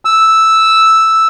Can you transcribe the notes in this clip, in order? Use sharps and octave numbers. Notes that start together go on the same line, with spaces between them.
E6